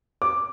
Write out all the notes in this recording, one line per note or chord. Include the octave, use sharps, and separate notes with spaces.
D6